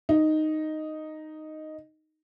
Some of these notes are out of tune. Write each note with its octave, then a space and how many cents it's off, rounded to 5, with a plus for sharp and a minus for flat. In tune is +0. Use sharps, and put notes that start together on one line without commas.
D#4 -5